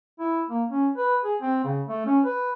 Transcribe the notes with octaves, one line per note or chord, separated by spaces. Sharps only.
E4
A#3
C#4
B4
G#4
C4
C#3
A3
C#4
B4